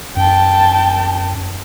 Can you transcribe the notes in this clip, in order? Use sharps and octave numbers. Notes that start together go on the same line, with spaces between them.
F#2 G5 A5